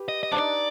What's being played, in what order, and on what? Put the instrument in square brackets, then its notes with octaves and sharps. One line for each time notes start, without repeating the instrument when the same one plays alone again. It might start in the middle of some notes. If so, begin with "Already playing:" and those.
Already playing: [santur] G4 B4
[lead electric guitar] D#5
D#5
[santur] D4 [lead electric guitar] C5
[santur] D#4 [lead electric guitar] D5